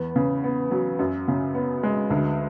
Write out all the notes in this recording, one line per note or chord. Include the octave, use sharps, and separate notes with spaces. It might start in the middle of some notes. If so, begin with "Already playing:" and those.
Already playing: E2 B3
C#3
B3
F#3
F#2
C#3
B3
G#3
D2